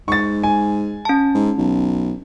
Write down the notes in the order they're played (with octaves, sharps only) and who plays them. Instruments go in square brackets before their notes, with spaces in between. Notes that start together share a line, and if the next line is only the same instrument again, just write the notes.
[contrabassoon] G#2 [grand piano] C#6 A6
[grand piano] G#5
[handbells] C#4 A5
[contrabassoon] G#2
B1